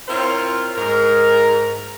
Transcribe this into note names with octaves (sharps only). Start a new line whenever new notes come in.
C4 E4 F4 A#4 C5 C#5
G#2 A#4